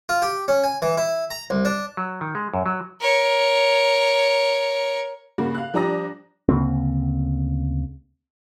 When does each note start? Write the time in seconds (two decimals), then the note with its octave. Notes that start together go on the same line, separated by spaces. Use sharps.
0.09 F4
0.22 G4
0.48 C#4
0.64 G#5
0.82 E3
0.97 E4
1.30 A#5
1.50 C2
1.65 D4
1.97 F#3
2.21 D#3
2.35 G#3
2.54 F#2
2.66 F#3
3.00 A#4 C#5
5.38 G2 C#3 A#3 F#4
5.55 F5 F#6
5.74 F3 G3 D4 A#5 D#6 A#6
6.49 D2 C#3 A#3 C4